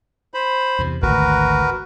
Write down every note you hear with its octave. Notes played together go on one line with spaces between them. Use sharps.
C5 B5
E2 C3
G#1 D2 F#4 A#4 B4